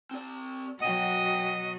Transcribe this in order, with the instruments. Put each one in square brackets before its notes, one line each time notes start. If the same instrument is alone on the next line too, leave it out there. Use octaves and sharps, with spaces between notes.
[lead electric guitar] C4 D5
[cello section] B2 F#3 F#4 [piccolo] D#5 [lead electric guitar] F#5 G5